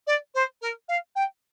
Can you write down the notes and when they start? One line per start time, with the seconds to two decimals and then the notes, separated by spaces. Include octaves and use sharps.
0.06 D5
0.34 C5
0.61 A#4
0.88 F5
1.15 G5